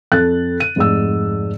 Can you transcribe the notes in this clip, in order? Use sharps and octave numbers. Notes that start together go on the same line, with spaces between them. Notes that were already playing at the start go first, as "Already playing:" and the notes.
F2 A4 F#6 A6
D#7
F1 G#2 E6